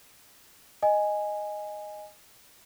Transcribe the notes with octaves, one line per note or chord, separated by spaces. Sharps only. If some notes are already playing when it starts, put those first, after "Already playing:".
D#5 G#5